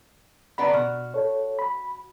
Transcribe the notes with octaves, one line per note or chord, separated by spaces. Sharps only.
D3 B3 D5 A#5 B5
B2 F#4 F6
A4 C#5
B5